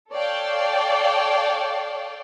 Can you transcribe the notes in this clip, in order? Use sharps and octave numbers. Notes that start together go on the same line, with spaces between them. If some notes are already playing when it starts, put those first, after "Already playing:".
A4 C#5 D5 F5 G5 A5